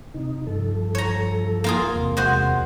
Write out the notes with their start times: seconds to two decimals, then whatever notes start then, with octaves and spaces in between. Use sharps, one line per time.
0.14 C3 D#4
0.47 G2 F3 A4
0.95 C#5 A#5
1.64 A#3 F4 G#4
1.96 E2 C3
2.17 G#3 F#4 C5